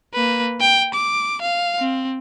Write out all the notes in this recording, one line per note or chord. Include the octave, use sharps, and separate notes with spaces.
A#3 B4
G5
D6
F5
C4